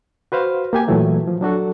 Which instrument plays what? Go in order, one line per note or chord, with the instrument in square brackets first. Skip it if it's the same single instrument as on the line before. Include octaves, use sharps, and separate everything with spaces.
[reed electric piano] F#4 B4 C5 F5
A#3 G4 G#5
A#2 E3 F#3 A3
F3
F#3 D4 F#4 A4